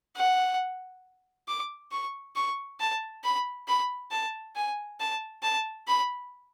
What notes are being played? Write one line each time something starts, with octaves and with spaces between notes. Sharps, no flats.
F#5
D6
C#6
C#6
A5
B5
B5
A5
G#5
A5
A5
B5